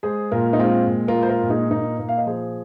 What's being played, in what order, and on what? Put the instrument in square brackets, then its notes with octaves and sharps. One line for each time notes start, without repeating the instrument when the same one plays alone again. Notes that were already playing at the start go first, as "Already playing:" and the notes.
[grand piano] G#3 G#4 C5
A#2 F4 A#4
D#4
G#3 C4 F4
A#2
F4 A#4
G#3
C5
F4 A#4
A#2
D#4 G#4
A#2 A#3 D#4
A#2 A#3
F5
D#5
F3 G#4 C5